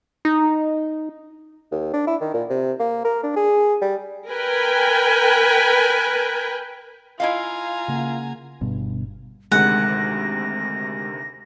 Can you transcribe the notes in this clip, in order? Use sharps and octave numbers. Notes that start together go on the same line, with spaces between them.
D#4
D#2
D4
E4
D#3
A#2
C3
A#3
A#4
D4
G#4
G3
A#4 B4 G5 G#5
E4 F4 D#5 F5 G#5 A#5
C#3 A#3 F#5
G1 G2 B2
D2 C3 D#3 G#3 F#5 A#6